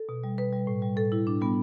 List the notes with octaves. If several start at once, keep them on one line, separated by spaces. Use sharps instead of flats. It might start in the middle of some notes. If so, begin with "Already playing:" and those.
Already playing: A4
B2
G3
B2 B4
G3
A2
G3
A2 A4
G3 E4
A2 D4
G3 B3